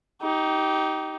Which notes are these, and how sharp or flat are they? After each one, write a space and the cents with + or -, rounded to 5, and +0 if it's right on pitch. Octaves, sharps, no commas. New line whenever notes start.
D#4 +15 G4 -20